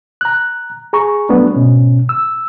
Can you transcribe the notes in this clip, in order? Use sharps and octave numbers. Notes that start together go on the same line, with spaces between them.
A#5 F#6
G#4 A#5 C#6
F#3 G3 A3 B3 D4
G#2 B2 C#4
E6